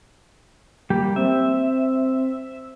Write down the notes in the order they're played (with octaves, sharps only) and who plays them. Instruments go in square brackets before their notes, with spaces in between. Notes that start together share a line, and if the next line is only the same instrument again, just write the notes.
[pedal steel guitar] G3 A#3 G4
[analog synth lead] C4 [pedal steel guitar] E5